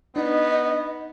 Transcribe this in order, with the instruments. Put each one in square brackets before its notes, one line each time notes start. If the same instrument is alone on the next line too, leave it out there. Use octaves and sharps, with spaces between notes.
[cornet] B3 [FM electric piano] D4 D#4 [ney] D#5